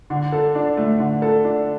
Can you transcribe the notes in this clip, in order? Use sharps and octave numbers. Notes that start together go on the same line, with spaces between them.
D3
A4
D4
A3
D3
A4
D4